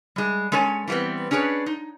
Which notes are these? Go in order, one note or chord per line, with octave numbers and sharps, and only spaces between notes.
G3 G#3
G#3 C#4 A4 C#5 G#5
E3 G3 A3 B3 C4
C#4 D4 G#4 B4 C#5
D#4